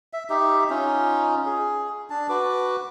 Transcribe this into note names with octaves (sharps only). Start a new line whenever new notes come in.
E5
D#4 G4 E5
C#4 D#4 F4
G#4
D4 A5
F#4 B4 D6